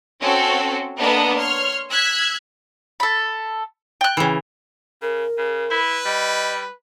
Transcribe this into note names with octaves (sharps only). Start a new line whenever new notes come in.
C4 C#4 F#4 A4
A#3 B3 D4 A4 B4 D#5
C#5 C6 F6
E6 F#6 G#6 B6
A4 B5
G5 F#6
C#3 E3
C#3 A#4
C#3
E4 B4
G3 D#5